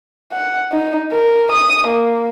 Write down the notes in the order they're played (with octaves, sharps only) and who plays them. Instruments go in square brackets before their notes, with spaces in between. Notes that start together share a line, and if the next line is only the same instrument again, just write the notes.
[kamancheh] F#5
D#4
A#4
D#6
A#3